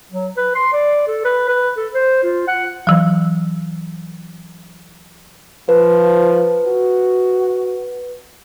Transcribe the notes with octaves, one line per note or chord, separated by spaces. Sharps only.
F#3
B4
C6
D5
A4
B4
B4
A4
C5
F4
F#5
E3 F#3
F3 B4
F#4